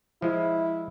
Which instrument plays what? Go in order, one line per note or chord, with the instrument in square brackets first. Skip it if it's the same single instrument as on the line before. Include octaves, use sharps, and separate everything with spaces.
[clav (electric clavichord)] F3 G#3 [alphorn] E4